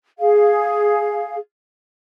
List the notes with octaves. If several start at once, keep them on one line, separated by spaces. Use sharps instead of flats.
G#4 F5